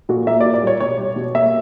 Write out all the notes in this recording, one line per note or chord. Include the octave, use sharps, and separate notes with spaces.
A#2 F#4
A#3 E5
A#2 D5
D5
G3 C#5
B2 C#5
G3
B2
A#3 E5